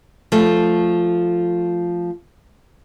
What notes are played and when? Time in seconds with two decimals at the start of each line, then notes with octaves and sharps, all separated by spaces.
0.32 F3 A3